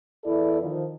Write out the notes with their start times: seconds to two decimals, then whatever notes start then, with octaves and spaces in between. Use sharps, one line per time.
0.24 E2 E4 A4 D5
0.62 D#3 F3